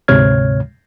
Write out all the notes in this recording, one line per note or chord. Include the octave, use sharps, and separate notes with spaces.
D2 G#2 C3 C#5 F6 G#6